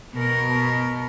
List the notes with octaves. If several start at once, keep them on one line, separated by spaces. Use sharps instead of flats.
B2 A#4